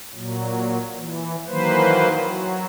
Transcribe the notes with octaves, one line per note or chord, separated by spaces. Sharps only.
A#2 F#3
E3
D#3 E3 F#3 A#3 B4 C5
F#3